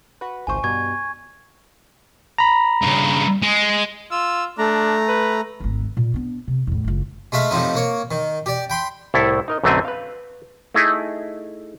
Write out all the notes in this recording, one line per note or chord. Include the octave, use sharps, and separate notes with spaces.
F#4 B4
G#1 C#2 C5 G#5 C#6
G2 B2 G3 G#5 C#6 G#6
A#5 B5
G2 C#3
G#3
F4 E6
A3 D4 A#5
B4
G#1 D2
A#2
B3 D4
C3
E2 A2
F#1 C#2
G#3 A3 E5 F5
A2 C3 F3 C4 D#4
A#3 C#5
D#3
G4 D5
G5 B5 C6
C2 A2 E4 A4
D#4 A#4 D#5
B1 F#2 D3 A3 C4 G#5
B4 F5
A3 D#4 E4 G#4